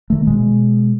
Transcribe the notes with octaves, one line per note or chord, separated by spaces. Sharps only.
D#3 A3
B2 G#3